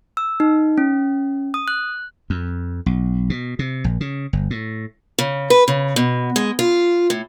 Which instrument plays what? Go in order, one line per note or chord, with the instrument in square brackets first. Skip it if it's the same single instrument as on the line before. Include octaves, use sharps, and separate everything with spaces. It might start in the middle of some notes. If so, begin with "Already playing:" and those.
[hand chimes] E6
D#4
C#4
D#6
F#6
[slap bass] F2
B1
B2
C3
A#1
C#3
G1
A2
[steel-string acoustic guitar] C#3
B4
C#3
B2
G#3
F4
A2